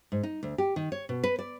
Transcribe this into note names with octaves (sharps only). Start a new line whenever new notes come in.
G#2
D#4
D2
G4
D#3
C#5
B2
B4
D5